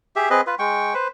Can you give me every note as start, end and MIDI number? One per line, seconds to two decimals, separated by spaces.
0.16 0.29 67
0.16 0.29 68
0.16 0.29 76
0.30 0.41 60
0.30 0.41 68
0.30 0.41 71
0.30 0.41 75
0.47 0.55 65
0.47 0.55 71
0.59 0.94 56
0.59 0.94 79
0.59 0.94 85
0.94 1.08 71
0.94 1.08 72